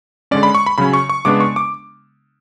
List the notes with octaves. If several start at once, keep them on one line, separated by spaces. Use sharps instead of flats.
D3 G#3 C#4 D5
B5
C#6
B5
C#3 F#3 C#4 B5
C#6
C#6
C#3 G#3 B3 D4 D6
C#6
D6